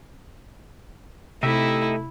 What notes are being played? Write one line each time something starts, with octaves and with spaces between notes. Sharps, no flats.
C3 A3 D#4 E4 G4 E5